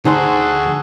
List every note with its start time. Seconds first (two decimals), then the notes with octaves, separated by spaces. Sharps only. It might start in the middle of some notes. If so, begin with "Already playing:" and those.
0.05 D2 D#4 F#4 G#4 A4 C5 C6